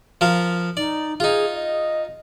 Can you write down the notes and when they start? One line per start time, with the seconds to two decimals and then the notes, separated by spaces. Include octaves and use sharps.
0.21 F3 A#4 F5
0.77 D#4 D5
1.20 D#4 F4 G#4
1.54 D#5